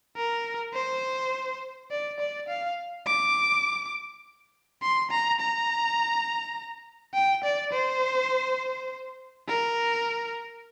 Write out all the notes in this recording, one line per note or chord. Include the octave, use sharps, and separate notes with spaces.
A#4
C5
D5
D5
F5
D6
C6
A#5
A#5
G5
D5
C5
A#4